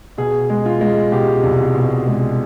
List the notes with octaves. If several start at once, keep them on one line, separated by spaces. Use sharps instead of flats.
B2 G#4
G#3
F4
G#3
B2 G4
C2
B2
G#3